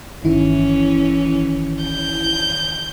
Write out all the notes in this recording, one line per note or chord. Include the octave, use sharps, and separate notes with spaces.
G1 D#3 E3 C#4 E4
G6